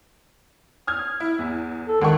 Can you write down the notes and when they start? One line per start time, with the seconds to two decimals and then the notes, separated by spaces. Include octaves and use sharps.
0.87 D#6 F6 G#6
1.20 E4
1.39 E2
1.88 A4
2.01 C#2 D#3 F#5 C#6